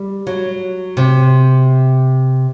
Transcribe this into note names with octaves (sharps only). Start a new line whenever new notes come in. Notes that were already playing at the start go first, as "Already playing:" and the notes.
Already playing: G3
F#3
C3